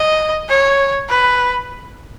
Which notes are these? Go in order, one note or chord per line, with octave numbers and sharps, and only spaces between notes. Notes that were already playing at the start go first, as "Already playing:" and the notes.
Already playing: D#5
C#5
B4